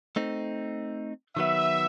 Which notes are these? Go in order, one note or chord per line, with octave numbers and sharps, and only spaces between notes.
A3 C4 D#4
D#3 F#3 B3 E5